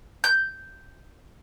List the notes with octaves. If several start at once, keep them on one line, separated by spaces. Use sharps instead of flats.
G6